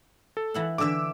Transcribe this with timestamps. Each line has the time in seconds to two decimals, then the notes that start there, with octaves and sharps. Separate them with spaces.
0.37 A4
0.54 E3 E4 F#5
0.78 D3 E3 E5 D6 E6